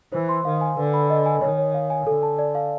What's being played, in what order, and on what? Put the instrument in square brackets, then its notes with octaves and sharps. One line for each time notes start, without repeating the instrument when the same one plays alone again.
[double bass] E3 [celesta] C5
[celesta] C6
[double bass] D#3 [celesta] F5
[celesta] G#5
[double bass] D3 [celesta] B4
[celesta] B5
D#5
G#5
[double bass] D#3 [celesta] C#5
[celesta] C#5
F5
G#5
[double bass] D3 [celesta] A4
[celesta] A5
D5
F5